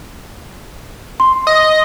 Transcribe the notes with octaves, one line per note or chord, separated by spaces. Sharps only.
C6
D#5